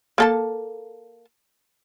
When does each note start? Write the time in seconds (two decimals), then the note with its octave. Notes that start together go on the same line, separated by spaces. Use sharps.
0.18 A#3 A4 A5